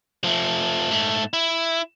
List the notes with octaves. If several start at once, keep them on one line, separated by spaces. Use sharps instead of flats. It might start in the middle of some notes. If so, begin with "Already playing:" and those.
F3 A3
G#2 A3
E4